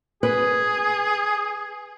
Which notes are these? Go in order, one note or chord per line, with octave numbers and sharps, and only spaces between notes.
G#4 B4